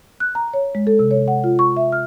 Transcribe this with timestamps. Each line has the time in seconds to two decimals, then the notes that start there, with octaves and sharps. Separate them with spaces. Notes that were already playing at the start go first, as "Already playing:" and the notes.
0.20 F#6
0.35 A#5
0.54 C#5
0.75 G#3
0.87 A4
0.99 C3
1.11 C#5
1.28 F#5
1.44 F4
1.59 C#6
1.77 E5
1.92 F6